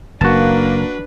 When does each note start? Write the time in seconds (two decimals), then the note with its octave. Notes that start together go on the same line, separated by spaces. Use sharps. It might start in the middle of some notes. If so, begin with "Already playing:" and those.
0.21 F#1 A#3 D4 F#4 B4 A5